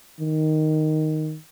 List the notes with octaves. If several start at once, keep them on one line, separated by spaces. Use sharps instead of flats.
D#3